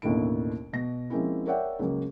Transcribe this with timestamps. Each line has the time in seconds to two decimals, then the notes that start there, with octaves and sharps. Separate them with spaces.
0.02 A1 D#2 B2 D3 E4 D7
0.73 B2 A#6
1.10 F3 G#3 A#3 C4 C#4 E4
1.46 A#4 C#5 D5 E5 F#5 G5
1.79 C#2 C#3 F#3 A#3